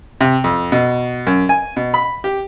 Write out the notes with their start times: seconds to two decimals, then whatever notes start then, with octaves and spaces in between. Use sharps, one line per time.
0.21 C3
0.44 F2
0.72 B2
1.27 F#2
1.49 G#5
1.77 B2
1.94 B5
2.24 G4